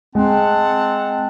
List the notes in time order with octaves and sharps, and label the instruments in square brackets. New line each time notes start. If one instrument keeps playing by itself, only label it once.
[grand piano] G#3 [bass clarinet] C4 [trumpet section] F#5 A5